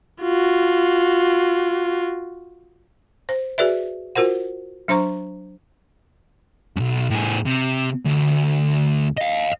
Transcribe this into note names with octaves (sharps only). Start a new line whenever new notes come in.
F4 F#4
C5
F#4 G#4 B4 D5 E5
F4 F#4 A#4 C5 F#5
F#3 D4 C5 A#5 C#6
B1 F#2
A2 G#4
C3
D2
D#5 F5